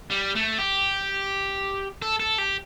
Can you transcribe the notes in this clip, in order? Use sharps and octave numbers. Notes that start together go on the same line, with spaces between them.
G3
A3
G4
A4
A4
G4